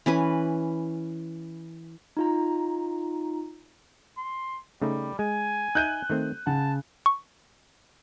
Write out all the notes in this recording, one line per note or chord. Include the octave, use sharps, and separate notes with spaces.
E3 C#4 B4
D#4 F4 A#5
C6
C#3 G3 A3 D#4
G#3 G#5
D#4 D#5 E5 F#6 G6 D#7
D#3 A3 C4
C#3 F#5 A5
C#6